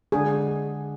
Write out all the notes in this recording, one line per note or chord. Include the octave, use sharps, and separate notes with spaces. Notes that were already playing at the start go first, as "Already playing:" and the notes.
D3 G#3 D4 G#4